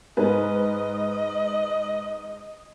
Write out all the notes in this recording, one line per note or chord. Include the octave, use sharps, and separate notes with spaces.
G#2 B4 D#5